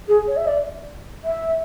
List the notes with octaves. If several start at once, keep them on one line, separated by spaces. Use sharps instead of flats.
G#4
C#5
E5
D5
E5